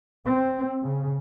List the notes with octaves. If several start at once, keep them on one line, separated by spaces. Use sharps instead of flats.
C4
C#3